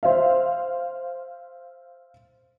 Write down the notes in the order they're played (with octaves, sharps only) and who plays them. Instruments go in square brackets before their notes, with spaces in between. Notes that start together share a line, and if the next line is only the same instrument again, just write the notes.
[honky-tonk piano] C5 E5 F5